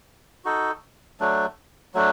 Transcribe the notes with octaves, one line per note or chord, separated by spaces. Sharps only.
D#4 F#4 A4
F#3 A3 D4
F#3 A3 D4